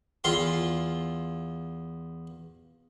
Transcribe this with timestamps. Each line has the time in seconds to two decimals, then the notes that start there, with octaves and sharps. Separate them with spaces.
0.24 E2 F4 C6